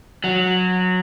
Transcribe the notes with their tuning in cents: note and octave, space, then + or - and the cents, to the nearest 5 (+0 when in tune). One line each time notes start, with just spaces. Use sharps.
F#3 -15